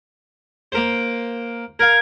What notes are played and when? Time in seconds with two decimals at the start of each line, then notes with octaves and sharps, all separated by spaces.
0.72 A#3 A#4 C5
1.79 A#4 F5 G#6